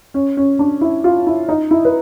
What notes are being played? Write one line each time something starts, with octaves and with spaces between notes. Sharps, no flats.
C#4
C#4
D4
E4
F4
E4
D#4
E4
B4